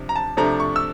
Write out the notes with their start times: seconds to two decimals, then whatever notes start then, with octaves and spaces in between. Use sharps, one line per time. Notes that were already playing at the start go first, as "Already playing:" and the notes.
Already playing: C3 F3 D4
0.09 A#5
0.16 A5
0.37 C3 F3 A3 D4 A#5
0.60 C#6
0.76 E6